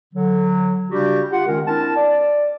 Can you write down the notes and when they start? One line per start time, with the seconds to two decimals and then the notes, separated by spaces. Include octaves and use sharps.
0.13 D3 F#3
0.90 C#3 G3 D4 F#4 G4
1.31 F4 G4 F#5
1.47 D#3 G#3 C#4 A#4
1.66 C4 D4 E4 A#4 A5
1.95 D5